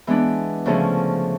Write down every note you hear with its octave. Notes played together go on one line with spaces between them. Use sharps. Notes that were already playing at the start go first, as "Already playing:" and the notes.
E3 G#3 B3 D4
D2 C#3 F3 A3 C#4